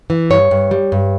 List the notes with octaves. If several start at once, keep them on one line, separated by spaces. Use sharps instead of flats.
E3
G2 C#5
G2
G3
G2